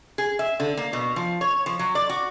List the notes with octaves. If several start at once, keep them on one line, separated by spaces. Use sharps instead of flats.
G#4
E5
D3
A#3
B2
F3
C#5
F3
F#3
D5
F#4